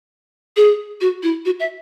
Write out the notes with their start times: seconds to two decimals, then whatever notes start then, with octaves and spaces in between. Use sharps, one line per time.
0.56 G#4
1.01 F#4
1.23 E4
1.45 F#4
1.60 E5